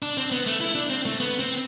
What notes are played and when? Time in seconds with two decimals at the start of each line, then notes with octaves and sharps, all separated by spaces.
0.02 D4
0.17 C4
0.31 B3
0.46 A3
0.61 E4
0.75 D4
0.90 C4
1.05 A3
1.20 B3
1.39 C4